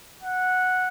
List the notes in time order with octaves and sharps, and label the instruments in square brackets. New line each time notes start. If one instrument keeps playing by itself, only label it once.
[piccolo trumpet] F#5